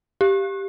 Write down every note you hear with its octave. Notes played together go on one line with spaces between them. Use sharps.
G4